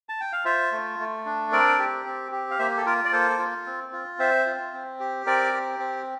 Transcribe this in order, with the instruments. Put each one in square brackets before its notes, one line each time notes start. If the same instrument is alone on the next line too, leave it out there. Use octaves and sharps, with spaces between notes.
[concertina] A5
G5
F5
F4 C5 E5
A3
A3
D4
C4 A#4 D5
G4
C4
G4
F5
A#3 C5 E5
A4
F4 A#4
D5
A#3 A4 C5
F4
C4
F4
C4 C5 E5
F4
C4
G4
C4 A#4 D5
G4
C4